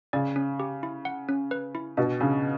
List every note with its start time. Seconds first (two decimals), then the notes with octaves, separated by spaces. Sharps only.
0.13 C#3 D5
0.36 C#4
0.60 G4
0.83 E4
1.05 F#5
1.29 C#4
1.51 B4
1.75 E4
1.97 B2 D4
2.21 C#3 D4